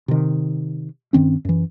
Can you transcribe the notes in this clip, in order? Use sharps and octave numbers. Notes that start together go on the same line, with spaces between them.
C3 D#3
G2 D#3 C4 C#4
F#2 E3